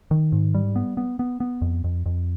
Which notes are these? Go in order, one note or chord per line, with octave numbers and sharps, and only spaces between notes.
D#3
G#2
G3
B3
B3
B3
B3
F2
F2
F2